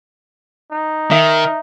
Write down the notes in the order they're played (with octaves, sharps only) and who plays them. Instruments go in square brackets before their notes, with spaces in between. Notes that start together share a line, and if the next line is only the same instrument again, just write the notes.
[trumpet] D#4
[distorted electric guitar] D#3 [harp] E5